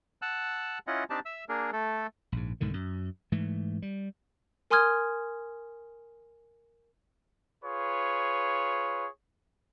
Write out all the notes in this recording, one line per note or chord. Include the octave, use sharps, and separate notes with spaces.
F#5 A5 E6 F#6
C#4 E4 F4 D#5 F#5
C4 D4 D#4 G4 D5 A5
E5 E6
A#3 D4 G#4 A#4
A3 A4
A#1 G#2
B1 G#2 D3 D#3
F#2
G#2 E3 A3
G3
A#4 G#5 C6 D#6 F6 G#6
F4 G#4 B4 C#5